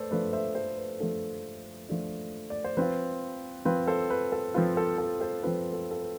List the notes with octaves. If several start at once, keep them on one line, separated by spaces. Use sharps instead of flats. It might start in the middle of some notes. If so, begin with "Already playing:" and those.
Already playing: A3 A4 B4 C5 D5
F3 A3 D4 B4 D5
C5 E5
A4 C5
B4
F3 A3 D4 A4
F3 A3 D4
D5
C5
F3 C4 F4 B4
F3 C4 F4 B4
A4 C5
B4
A4
F3 C4 F4 B4
A4
A4
A4 C5
F3 C4 F4 B4
A4
A4
B4